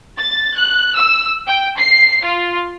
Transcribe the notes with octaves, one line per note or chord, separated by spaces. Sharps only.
A6
F#6
E6
G5
C7
F4